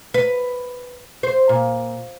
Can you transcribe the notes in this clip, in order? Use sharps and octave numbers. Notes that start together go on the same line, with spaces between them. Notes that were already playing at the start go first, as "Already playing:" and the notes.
B4
C5
A#2